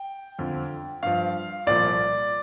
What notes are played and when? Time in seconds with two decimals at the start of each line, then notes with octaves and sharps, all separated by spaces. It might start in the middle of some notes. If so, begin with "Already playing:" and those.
Already playing: G5
0.39 F2 D3 F3
1.03 G2 F3 F5
1.67 C2 A#2 F3 D5